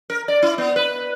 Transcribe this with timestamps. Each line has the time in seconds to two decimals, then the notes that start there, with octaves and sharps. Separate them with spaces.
0.10 A#4
0.28 D5
0.42 E4
0.58 B3
0.76 B4